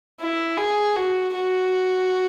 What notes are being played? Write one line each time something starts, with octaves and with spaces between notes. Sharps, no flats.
E4
G#4
F#4
F#4